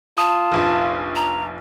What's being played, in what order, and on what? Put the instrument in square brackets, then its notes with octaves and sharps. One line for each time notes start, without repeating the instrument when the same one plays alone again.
[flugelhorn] F4 [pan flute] A5 [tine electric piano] D#6
[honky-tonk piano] F1 A#1 F3
[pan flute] A#5